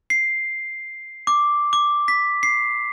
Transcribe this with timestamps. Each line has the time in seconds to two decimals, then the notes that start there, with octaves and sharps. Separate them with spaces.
0.10 C7
1.27 D6
1.73 D6
2.08 B6
2.43 C7